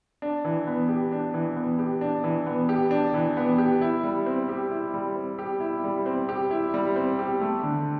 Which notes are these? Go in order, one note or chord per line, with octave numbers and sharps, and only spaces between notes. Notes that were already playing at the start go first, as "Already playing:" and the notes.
D4
E3
B3
G4
D4
E3
B3
G4
D4
E3
B3
G4
D4
E3
B3
G4
E4
G3
C4
G4
E4
G3
C4
G4
E4
G3
C4
G4
E4
G3
C4
G4
A3
D3